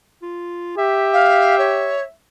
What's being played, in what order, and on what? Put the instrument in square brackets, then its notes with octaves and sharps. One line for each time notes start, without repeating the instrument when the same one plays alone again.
[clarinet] F4
[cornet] G4 [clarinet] E5
[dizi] F5
C#5